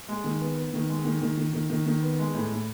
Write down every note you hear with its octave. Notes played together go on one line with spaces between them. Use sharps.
G#3
D#3
B3
B3
D#3
G#3
D#3
D#3
D#3
D#3
D#3
D#3
B3
G#3
A2
A2